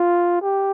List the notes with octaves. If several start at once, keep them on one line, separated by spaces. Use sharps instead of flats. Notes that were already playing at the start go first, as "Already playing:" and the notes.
Already playing: F4
G4